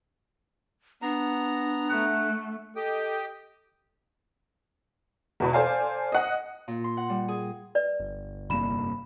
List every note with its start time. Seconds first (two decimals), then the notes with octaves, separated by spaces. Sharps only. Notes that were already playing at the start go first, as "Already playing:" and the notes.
1.02 B3 D4 A#5
1.90 A3 F#5
2.76 G4 A4 D#5 G5
5.40 E2 B2 B4
5.53 A4 C5 D5 F5 G#5
6.12 D#5 F#5
6.68 A#2
6.84 C6
6.97 F#5
7.09 G3
7.28 G#4
7.75 B4 D5
8.00 G1
8.50 F1 G2 A#3 B5 E7